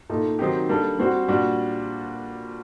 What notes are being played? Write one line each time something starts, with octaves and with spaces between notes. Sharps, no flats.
A#2 A3 D#4 A4
D#3 F#3 C4 D#4 G4
G3 A#3 D4 A4
G3 C4 F#4
A#2 G3 D4 F#4